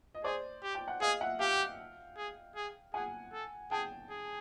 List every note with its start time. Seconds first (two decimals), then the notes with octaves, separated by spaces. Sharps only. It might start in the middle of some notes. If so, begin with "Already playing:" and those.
0.15 D#5
0.24 G#4 C5 D5
0.63 G4
0.75 G5
0.88 F#5
1.01 G#4 D#5 F5
1.20 E5 F#5
1.40 G4 F5 G5
2.17 G#4
2.56 G#4
2.94 G#4 F#5 G#5
3.33 A4
3.71 G#4 G5 A5
4.10 G#4